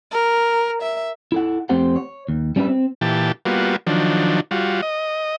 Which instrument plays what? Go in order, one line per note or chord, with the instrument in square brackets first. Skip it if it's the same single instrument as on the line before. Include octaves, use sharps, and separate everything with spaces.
[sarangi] A#4
E5
[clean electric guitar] E4 A4 F#5
F2 A3 C4 G4 C5 F#5
C#5
D#2
G3 C#4 D4 F#4 B4 E5
C4
[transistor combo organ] A#2 E3 G4 A5
G3 A#3 B3 F4 F#4
D#3 F3 F#3 D4
G3 F4 F#4
D#5